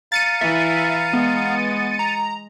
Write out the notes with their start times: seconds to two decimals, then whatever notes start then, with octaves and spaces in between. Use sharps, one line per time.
0.12 F5 A#5 A6 C#7 D#7
0.41 E3 E4 E5
1.13 G#3 B3
1.99 A#5